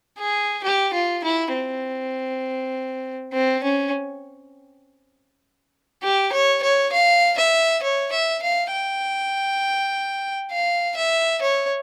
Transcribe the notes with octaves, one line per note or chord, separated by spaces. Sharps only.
G#4
G4
F4
E4
C4
C4
C#4
G4
C#5
C#5
F5
E5
C#5
E5
F5
G5
F5
E5
C#5